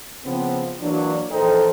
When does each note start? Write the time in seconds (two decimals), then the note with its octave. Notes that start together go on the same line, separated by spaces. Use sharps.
0.24 C#3 F3 B3 C4
0.81 E3 F#3 A#3 D4
1.31 A#1 E3 D#4 A4 C5 G5